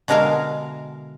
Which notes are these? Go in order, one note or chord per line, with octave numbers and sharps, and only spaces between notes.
B2 D3 G#3 A#4 E5 F5